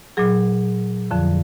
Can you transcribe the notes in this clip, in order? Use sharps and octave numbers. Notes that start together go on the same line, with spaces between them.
A#2 F#3 G#4
F2 D3 F3